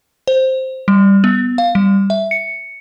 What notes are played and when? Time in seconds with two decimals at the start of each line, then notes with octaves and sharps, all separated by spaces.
0.28 C5
0.88 G3
1.24 B3
1.58 F5
1.75 G3
2.10 E5
2.31 C#7